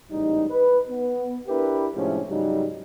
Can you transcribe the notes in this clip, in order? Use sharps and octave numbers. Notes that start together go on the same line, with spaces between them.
A1 G#2 G3 D#4
B4
B3
D4 E4 G4 A#4 B4
A2 C3 F3 G#3 C#4 D4
G#2 C#3 F#3 G3 D#4